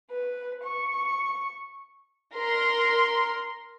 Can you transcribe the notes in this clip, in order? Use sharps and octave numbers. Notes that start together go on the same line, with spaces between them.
B4
C#6
A#4 C6